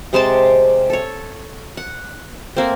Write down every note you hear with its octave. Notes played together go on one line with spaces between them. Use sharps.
C3 G#3 C5 A5
A4 C#5
F#5
A3 A#3 C4